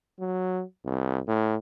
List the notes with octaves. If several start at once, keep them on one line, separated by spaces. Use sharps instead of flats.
F#3
C2
A2